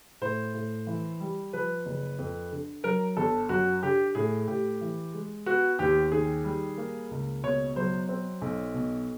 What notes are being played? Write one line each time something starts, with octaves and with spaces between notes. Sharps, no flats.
A2 C5
A2
E3
G3
F3 B4
F#1
F2
D3
F#3 A#4
G1 A4
F#2 F#4
D3 G4
A2 G#4
A2 G4
E3
G#3
B3 F#4
D#2 G4
D#3 G#4
G3
A#3
C#2
B2 C#5
F#3 C5
C4
B1
B2